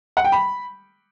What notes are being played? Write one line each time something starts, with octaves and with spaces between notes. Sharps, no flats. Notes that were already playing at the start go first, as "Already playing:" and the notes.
F#5
G5
B5